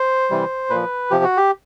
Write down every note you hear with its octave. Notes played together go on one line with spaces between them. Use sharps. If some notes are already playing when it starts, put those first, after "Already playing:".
Already playing: C5
C3 E3 G3
A#2 F3 B4
C3 F3 G4
F#4
G4